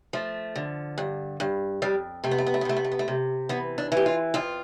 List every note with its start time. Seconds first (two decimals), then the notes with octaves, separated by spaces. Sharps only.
0.13 F3 A3
0.56 D3
0.98 G2
1.40 G2
1.82 F2 G3
2.24 C3 A3
2.31 B3
2.38 A3
2.46 B3
2.54 A3
2.61 B3
2.65 C3 A3
2.76 B3
2.84 A3
2.92 B3
2.99 A3
3.08 C3
3.49 E3 B3
3.78 D4
3.92 E3
3.97 G4
4.06 F4
4.34 F2 F4